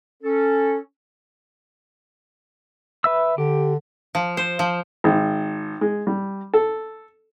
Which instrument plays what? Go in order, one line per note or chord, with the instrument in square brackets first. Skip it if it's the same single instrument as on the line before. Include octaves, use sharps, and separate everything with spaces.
[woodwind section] C#4 A4
[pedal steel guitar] B4 E5 E6
[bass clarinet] D3 [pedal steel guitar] G4
[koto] F3
C5
F3
[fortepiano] G#1
G#3
G3
A4